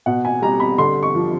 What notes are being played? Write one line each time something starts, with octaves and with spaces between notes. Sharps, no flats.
B2 F#5
G#5
G3 A#5
B5
D3 C6
C#6
F3